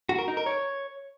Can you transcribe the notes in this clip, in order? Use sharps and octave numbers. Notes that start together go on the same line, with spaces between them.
F#4
A#4
D#4
A#4
C#5